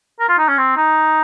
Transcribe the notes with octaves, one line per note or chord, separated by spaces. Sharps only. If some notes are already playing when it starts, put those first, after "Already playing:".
A#4
F4
D#4
C#4
C4
D#4